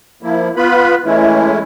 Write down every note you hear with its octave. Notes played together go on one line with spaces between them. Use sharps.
F3 A#3 E4
B3 F4 B4 B5
E3 G#3 A3 C#4 E4